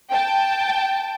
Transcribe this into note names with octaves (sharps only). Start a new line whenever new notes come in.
G5 A5